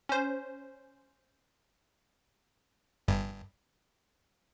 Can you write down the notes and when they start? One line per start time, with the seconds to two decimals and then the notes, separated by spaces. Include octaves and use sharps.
0.09 C#4 C5
3.08 G1 G2